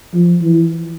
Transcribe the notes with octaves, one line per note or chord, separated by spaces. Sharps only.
F3
E3